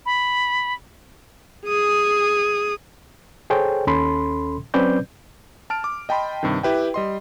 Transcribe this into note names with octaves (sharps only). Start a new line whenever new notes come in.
B5
G#4 D#6
G#4 A4 C5 C#5 G5
D#2 C#4 A4 B5 C6
F#3 C4 C#4 B4 D5 G6
A5 F6 D7
D6
D#5 G5 A5 B5 C6
G2 C3 D#3
E4 G4 B4 E5 G5
G3 D#5 C6